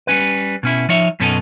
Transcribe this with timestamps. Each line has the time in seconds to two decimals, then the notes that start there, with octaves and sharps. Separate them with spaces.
0.07 G3 C#4 B4
0.63 B2 C#4 E4
0.89 F3 D#4 C#5 E5
1.20 F#2 B2 C#4 D#4 A4